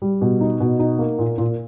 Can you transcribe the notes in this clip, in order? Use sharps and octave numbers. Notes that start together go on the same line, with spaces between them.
G3
B2
D#4
B2
D#4
A#3
A#2
A#2